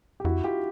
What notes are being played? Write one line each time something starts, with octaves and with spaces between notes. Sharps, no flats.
G4
F2 E4 F#4
F4 G4